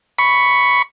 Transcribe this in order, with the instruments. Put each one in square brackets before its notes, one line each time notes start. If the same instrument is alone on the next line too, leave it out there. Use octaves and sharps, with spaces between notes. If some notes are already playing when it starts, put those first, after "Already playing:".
[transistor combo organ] B5 C#6